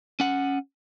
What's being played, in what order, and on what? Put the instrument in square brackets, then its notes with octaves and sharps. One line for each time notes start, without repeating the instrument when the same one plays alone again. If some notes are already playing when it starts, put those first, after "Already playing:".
[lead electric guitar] C#4 F#5